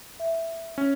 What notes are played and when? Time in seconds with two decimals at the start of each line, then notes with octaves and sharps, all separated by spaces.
0.20 E5
0.78 C#4